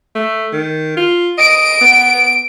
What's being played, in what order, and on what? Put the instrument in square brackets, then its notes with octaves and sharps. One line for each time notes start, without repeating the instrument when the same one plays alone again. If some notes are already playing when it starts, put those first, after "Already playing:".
[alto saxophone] A3
D#3
F4
[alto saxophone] D#5 [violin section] D7
[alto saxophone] B3